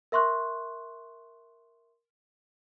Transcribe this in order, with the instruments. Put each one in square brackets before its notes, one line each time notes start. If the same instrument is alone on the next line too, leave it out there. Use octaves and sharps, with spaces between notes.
[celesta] A#4 E5 C6 C#6 F#6